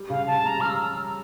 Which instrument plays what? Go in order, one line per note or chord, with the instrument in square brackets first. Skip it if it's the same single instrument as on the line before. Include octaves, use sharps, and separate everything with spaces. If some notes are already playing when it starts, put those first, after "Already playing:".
Already playing: [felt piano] G3
[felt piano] C#3 [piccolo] F5
[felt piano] C#3 [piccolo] A5
[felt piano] G3 [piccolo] A#5
[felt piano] G3 [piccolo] F6
[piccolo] E6